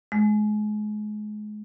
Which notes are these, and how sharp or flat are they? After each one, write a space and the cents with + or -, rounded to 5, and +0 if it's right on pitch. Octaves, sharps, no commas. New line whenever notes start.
G#3 +30